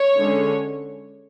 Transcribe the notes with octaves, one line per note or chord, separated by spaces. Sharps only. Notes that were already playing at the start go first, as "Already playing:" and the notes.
Already playing: C#5
D3 G#3 C#4